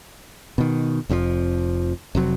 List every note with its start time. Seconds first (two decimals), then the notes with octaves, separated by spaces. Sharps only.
0.58 B2 D#3
1.09 F1 F2 B2 F3
2.15 F1 C3 F#3